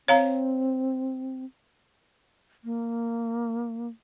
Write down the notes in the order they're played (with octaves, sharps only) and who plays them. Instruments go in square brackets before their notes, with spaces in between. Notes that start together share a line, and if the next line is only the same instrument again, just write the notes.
[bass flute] C4 [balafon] C#5 F5 A#5
[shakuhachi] A#3